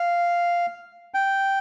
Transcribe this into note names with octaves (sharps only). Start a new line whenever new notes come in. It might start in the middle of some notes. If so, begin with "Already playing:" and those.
Already playing: F5
G5